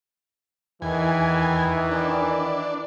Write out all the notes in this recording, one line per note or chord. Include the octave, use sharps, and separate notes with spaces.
E2 D#3 E3 G#5
D4